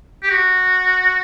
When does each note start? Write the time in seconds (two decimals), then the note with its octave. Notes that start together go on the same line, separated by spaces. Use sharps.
0.23 G4
0.30 F#4